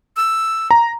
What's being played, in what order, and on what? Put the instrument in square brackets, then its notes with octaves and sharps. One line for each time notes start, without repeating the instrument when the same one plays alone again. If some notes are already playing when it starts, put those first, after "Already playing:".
[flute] E6
[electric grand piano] A#5